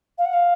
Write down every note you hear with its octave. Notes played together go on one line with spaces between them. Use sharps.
F5
F#5
F5